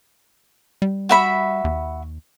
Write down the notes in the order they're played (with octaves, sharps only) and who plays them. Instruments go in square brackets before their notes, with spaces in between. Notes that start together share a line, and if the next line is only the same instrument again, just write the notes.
[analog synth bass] G3
[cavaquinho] F#4 E5 B5
[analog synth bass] D#2